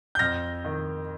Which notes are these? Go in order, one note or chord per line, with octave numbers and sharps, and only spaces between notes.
G6
F2 F6 A#6
D#3